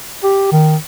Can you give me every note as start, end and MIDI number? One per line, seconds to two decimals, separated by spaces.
0.24 0.51 67
0.52 0.76 51